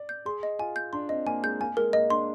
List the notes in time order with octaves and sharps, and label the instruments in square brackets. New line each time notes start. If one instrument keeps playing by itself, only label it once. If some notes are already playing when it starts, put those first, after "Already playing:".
Already playing: [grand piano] D5
[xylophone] G6
[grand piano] G#4 [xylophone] C6
[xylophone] D#5
[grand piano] F4 [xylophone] G#5
[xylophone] G6
[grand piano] D4 [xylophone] C6
[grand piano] C4 [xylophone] D#5
[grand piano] A#3 [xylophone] G#5
[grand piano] G#3 [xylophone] G6
[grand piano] A#3 [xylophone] G#5
[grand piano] G#3 [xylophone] A#4
[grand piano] A#3 [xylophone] D#5
[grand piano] D4 [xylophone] C6